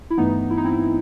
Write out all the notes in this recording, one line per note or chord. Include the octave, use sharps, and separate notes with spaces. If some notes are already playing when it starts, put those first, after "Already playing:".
E4
G2 E3 A3 B3 D#4
E4
D#4
C4 E4